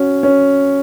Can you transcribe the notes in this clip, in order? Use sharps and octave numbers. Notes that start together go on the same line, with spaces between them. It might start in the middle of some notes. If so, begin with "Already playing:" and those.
Already playing: C#4 F#4
C#4